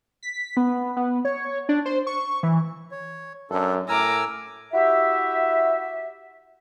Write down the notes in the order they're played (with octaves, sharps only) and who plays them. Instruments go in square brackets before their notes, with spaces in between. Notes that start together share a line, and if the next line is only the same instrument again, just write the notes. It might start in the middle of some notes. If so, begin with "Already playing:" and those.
[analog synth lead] B6
B3
B3
C#5
D4
C5
C#6
E3
[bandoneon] C#5
[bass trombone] F#2 [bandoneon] D4 A4
[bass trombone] A2 [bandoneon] A#4 G#5 E6 [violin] A#5 D6
[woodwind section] E4 F#4 G4 E5